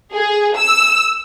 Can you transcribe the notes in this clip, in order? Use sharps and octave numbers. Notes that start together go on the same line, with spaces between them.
G#4
E6